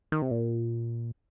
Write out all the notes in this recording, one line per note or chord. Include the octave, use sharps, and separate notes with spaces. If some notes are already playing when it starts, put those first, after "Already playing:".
D#3
C3
A#2